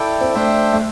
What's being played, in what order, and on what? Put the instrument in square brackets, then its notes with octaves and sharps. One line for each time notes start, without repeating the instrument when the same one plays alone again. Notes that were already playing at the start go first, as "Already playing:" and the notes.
Already playing: [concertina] E4 A4 D5 G5
[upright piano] C4
[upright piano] A3 [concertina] D4 C5 E5 G5
[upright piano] A3